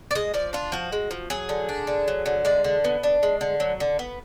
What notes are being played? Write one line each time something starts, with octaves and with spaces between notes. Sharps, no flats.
D5
G#3 D#5
F3 D5
D4 F4
F3 F#4
G#3
F3
F#3 G#4
D3
D4
D3
F#3
D3
G#3 D5
D3
B3
D4
G#3
D3
F#3
D3
B3